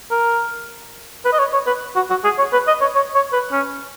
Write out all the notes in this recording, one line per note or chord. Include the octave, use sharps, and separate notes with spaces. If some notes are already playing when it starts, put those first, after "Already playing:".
A#4
B4
D#5
C#5
C#5
B4
F#4
F#4
G#4
C#5
B4
D#5
C#5
C#5
C#5
B4
C#4